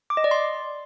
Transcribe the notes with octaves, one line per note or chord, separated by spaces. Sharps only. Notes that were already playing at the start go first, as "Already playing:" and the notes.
D6
D#5
D5
C6